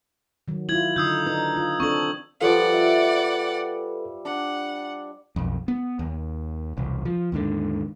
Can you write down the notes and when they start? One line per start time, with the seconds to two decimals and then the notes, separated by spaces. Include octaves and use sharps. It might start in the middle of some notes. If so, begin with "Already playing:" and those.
0.48 D#3 F#3
0.69 E4 F4 G#6 F#7
0.96 D3 D#4 D#6 E6 G6
1.26 D4 D#4 B4
1.57 F4
1.80 C4 D4 A4 C#6 F#7
2.41 F3 G3 A4 B4 D5 F#5
2.72 E5
4.25 D4 F#5
5.36 B1 F2
5.68 B3
5.99 D#2
6.77 E1 C2
7.05 F3
7.32 D#2 G#2 D3